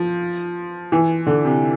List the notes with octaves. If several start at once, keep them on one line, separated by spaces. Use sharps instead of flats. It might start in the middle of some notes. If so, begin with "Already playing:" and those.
Already playing: F3
E3
D3
C3